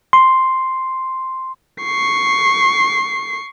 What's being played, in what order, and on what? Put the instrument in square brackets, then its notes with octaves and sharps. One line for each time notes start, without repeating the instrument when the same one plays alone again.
[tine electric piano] C6
[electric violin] C#6 C7